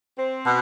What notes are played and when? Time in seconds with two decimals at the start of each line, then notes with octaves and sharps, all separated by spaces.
0.18 C4
0.46 B2